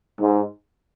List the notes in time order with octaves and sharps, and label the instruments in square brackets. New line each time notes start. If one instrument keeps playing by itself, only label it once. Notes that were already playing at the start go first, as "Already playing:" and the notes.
[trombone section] G#2